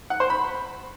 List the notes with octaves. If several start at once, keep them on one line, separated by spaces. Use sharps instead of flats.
F#5
C5
B5